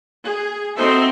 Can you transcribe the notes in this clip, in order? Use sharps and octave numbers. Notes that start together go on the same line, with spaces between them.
G#4
C4 D#4 F#4 A4 C5 E5